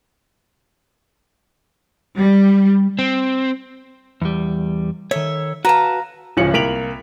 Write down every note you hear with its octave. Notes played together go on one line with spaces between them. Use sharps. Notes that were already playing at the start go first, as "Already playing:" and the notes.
G3
C4
E2 G3
D#3 A4 C#5 E5
F#4 B4 F5 A5 A#5
D1 C#2 F3 C#4 C#7 F#7
C2 A#3 B6 D7 F7 F#7